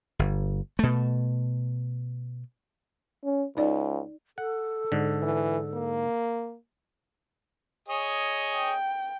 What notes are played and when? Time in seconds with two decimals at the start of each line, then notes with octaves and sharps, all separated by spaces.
0.19 G1
0.79 B2 A3
3.24 C#4
3.57 C#2 D#4 D5
4.38 A4 F#5
4.92 G#2 D3
5.23 E3
5.74 A#3
7.89 G#4 C#5 D#5
8.56 G5